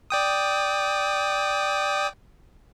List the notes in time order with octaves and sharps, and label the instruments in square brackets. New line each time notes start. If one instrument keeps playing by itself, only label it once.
[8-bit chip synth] D5 G5 D#6